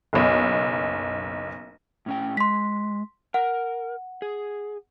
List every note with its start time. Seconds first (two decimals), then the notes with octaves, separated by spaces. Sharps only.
0.13 F#1 B1
2.06 A2 C#4 G5
2.37 G#3 C6 B6
3.34 A#4 F#5
4.22 G#4